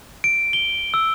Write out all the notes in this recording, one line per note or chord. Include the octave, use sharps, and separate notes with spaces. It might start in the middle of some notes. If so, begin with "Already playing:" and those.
D7
G7
E6